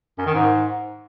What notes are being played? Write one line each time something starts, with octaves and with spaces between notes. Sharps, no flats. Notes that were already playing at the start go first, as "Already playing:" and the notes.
F#2
D#3
G#2